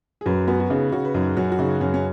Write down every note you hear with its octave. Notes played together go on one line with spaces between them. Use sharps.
G#4
F#2 F#4 B4
B3 C#4 F#4
F#4
C#3 D#4
C#3 C#4 F#4
B4
F#2 D#4 G#4
F#2 C#4 F#4
F#4
C#3 D#4
F#2 C#4
C#4